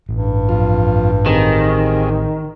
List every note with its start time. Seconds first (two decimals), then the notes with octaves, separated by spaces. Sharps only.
0.09 A1 G2
0.49 F2 F4
1.26 D#3 C4 G4 G#4